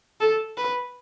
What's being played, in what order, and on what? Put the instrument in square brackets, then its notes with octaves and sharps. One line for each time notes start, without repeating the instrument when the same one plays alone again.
[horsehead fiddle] A4
B4